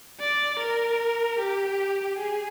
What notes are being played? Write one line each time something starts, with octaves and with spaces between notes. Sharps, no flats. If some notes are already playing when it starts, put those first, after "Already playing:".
D5
A#4
G4
G#4